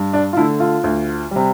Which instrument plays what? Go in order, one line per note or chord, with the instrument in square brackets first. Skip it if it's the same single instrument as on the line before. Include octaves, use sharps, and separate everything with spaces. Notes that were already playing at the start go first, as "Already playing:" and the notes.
Already playing: [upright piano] G2
D4
F4
D3 A3 E4
F4
D2
C3 G3